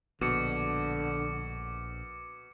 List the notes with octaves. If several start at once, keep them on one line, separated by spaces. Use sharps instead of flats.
A#1 B2 D3 D6 C#7